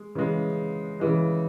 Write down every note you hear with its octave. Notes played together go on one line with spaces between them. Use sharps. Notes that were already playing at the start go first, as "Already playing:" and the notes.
Already playing: G#3
C#3 E3 G#3
C#3 E3 G#3